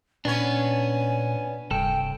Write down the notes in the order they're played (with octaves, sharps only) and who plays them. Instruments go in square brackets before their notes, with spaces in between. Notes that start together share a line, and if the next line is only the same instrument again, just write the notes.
[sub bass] A#2 [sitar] B3 C#4 C#5 [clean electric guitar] D4 [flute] G#5
[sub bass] D#1 [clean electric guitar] C2 G2 A4 [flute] G5